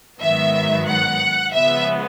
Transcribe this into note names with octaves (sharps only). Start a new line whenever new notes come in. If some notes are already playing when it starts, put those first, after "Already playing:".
G#2 D#3 F#3 B3 E5
F#5
C#3 F3 G#3 B3 E5